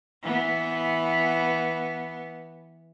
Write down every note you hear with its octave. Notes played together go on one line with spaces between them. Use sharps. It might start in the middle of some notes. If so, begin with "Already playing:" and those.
E3 B3